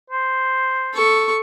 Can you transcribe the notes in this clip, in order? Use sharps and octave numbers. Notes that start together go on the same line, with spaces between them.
C5
A4 C#6